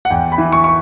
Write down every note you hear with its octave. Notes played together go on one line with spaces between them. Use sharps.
F#5
E2 G5
B5
E3
C#6
C#6